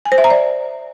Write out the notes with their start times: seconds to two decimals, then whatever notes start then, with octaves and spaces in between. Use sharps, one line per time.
0.05 G#5
0.12 C5
0.18 E5
0.24 A#5
0.30 D5